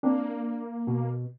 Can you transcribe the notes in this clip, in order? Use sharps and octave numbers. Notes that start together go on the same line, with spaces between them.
A#3 C4 D4
B2